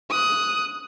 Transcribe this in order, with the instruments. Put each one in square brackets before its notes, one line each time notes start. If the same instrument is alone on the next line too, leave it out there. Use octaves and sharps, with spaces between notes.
[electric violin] D#6 F#6